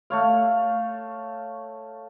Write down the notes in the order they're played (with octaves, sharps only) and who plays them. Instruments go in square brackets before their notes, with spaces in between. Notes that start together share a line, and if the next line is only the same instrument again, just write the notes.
[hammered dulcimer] A3 C#5 F5